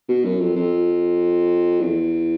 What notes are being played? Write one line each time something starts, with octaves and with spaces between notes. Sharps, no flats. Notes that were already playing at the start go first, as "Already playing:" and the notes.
B2
F#2
F2
F2
E2